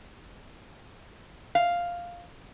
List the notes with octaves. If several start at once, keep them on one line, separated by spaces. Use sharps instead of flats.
F5